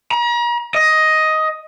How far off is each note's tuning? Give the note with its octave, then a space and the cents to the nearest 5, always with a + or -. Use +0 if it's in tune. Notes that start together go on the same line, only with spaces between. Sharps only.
A#5 +40
D#5 +10